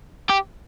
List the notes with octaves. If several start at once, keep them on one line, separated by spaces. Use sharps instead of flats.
G4